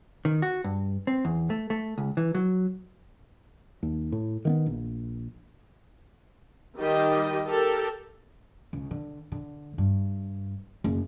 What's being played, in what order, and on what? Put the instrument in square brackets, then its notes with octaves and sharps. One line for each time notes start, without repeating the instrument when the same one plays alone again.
[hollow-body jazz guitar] D#3
F#4
G2
C4
E2
A3
A3
C#2
E3
F#3
[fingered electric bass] D#2
A2
D#3 A#3 B3
A#1
[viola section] D#3 G3 G4 D#5
G4 A4 A#4
[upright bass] C#2
D3
D3
G2
F#1